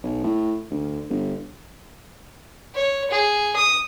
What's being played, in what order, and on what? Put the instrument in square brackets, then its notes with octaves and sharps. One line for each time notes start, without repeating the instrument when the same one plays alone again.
[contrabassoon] B1
A2
D2
G1
[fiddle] C#5
G#4
D#6